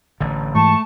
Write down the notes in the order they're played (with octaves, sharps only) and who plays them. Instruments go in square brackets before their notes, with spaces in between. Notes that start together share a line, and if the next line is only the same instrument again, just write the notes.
[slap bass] A1 D3
[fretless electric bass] G#2 E3 [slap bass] A3 [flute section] A5 [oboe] C#6